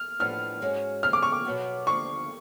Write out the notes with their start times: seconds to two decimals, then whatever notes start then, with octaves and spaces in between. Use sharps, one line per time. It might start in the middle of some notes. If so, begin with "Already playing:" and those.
Already playing: F6
0.20 A2 F3 B3 D4 F6
0.61 G#2 G#3 C#4 F#4
1.03 C#3 F3 G#3 F6
1.13 D6
1.22 C#6
1.32 D6
1.45 B2 F#3 B3 F#4
1.87 D2 D3 F3 C#6